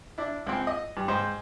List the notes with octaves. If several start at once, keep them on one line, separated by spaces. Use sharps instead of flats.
D4 E4
C#2 C4
D#5
G2
G#2 C5 G5